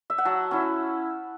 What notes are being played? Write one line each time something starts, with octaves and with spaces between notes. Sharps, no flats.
E5
F#5
F#3 A5
C#4 E4